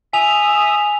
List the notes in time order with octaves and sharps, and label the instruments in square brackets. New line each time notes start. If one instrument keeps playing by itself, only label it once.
[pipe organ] E5 D#6 [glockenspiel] G#5 F7